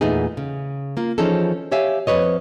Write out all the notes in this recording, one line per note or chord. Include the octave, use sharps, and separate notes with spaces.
E2 A#2 A3 B3 D#4 G#4
C#3
A#3 F4
E3 F3 C#4 D#4 G#4 A4
G4 C#5 E5 F5 G#5
F2 C3 B4 C#5 D#5